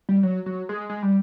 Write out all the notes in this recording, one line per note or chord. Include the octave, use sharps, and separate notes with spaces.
G3
F#3
F#3
G#3
G#3
G3